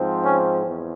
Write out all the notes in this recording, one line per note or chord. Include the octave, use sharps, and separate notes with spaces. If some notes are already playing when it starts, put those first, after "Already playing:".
Already playing: G#2 F3 C4
C#4
E2